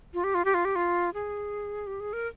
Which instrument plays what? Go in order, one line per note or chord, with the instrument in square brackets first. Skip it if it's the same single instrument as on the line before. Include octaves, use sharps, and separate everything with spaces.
[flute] F4
G4
F4
G4
F4
G4
F4
G#4
G4
G#4
A#4